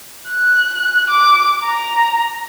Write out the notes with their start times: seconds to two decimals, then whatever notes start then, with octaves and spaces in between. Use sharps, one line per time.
0.28 F#6
1.10 D6
1.64 A#5